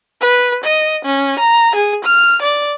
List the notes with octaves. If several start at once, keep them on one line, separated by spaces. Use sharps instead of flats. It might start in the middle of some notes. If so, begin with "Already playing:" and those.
B4
D#5
C#4
A#5
G#4
F6
D5